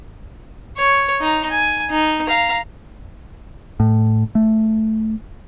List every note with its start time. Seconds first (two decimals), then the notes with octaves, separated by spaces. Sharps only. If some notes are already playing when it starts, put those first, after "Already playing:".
0.78 C#5
1.21 D#4 A#5
1.51 G#5
1.91 D#4
2.26 F5 A#5
3.80 A2
4.35 A3